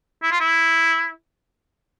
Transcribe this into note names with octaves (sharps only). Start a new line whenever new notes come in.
E4
F4
E4